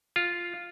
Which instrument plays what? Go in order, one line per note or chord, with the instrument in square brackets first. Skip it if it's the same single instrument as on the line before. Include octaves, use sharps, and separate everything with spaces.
[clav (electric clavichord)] F4